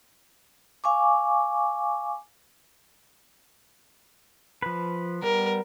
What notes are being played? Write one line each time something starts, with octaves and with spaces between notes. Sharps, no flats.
F5 G#5 C#6 D6
F3 B4
G3 B3 A#4